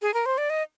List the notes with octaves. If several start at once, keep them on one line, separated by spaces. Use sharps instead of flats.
G#4
A#4
C5
D5
D#5